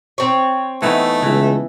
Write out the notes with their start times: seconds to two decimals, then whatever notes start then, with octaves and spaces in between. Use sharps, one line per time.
0.18 C4 C#5
0.82 E3 A3 B3 D#4
1.23 C#2 E3